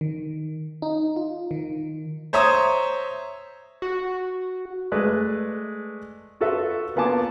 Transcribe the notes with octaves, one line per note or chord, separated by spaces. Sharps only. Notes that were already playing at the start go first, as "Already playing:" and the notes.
D#3
D#4
F4
D#3
C5 C#5 E5 A#5 D#6
F#4
G#3 A3 B4 D5 F#6
F4 F#4 A4 B4 E5
A#3 B3 F4 G#5 A5 D6